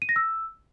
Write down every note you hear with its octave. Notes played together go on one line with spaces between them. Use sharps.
D#7
A#6
E6